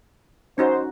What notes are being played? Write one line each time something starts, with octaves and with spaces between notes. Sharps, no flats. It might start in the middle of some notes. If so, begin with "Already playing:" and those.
C#4 D#4 F#4 C5